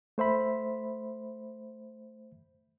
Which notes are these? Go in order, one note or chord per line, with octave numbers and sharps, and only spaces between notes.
A3 C5 E5 B5